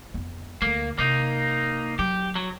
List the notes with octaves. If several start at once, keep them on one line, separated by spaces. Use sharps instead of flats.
F2 B3
D2 A3 A#3
C3 A#3 D#4
F#3 G4
F#3